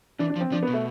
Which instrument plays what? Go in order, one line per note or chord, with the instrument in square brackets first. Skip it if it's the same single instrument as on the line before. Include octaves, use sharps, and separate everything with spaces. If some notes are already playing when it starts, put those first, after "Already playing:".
[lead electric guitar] E3 [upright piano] D4
[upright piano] D4
[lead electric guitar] F3
[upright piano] C4
[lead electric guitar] F3 [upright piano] D4
[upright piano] B3
[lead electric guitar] B2
[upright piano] A3